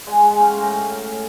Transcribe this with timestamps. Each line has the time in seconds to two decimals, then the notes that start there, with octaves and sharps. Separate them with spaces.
0.06 G#3 F#5 G#5
0.23 G#3
0.39 C#4 F5 G5
0.56 A2 A#5